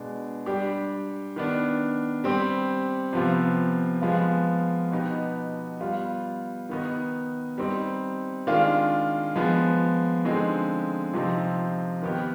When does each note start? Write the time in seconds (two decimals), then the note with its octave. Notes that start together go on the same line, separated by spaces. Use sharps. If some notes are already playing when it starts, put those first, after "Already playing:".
Already playing: B2 G#3 D4
0.46 G3 D4 G4
1.36 D#3 B3 D4
2.24 G3 C4 G4
3.13 C3 F3 B3 F4
4.02 F3 G#3 B3 F4
4.91 B2 B3 D#4 G4
5.80 G3 B3 F4
6.69 D#3 B3 D#4
7.58 G3 C4 D#4
8.47 D#3 G#3 D4 F4
9.36 F3 G#3 B3
10.25 D3 F3 G#3 C4 D#4
11.13 C3 F3 C4 D#4
12.02 D#3 B3 D#4 G4